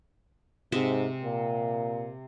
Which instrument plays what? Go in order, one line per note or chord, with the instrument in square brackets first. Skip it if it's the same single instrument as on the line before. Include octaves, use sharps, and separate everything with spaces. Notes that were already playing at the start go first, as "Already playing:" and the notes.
[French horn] G#2 [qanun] C3 G#3 E5
[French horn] A#2